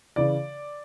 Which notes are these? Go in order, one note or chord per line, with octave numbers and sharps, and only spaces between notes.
C#3 E3 D5